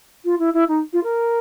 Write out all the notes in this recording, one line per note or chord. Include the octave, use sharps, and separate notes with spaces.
F4
E4
E4
D#4
F4
A#4